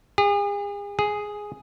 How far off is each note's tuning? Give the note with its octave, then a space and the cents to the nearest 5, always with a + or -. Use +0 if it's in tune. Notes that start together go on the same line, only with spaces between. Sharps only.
G#4 -40
G#4 +0